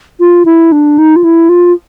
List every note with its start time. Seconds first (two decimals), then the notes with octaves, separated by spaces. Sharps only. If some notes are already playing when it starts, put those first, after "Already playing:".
0.20 F4
0.45 E4
0.72 D4
0.98 D#4
1.16 F4
1.24 E4
1.49 F4